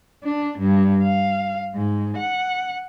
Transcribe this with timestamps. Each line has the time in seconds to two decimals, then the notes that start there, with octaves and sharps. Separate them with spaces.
0.23 D4
0.58 G2
1.03 F5
1.74 G#2
2.17 F#5